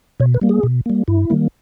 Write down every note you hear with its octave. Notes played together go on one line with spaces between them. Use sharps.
B2 C#5
B4
G3 A#3
G#4
B2
G3 A#3
G2 E4
D#3 G3 A#3